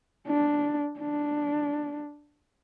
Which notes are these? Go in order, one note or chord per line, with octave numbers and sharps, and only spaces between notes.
D4
D4